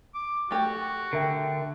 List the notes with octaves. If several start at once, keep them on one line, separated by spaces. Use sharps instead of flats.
D6
A3 F#4 G4
D3 A#4 E5 G5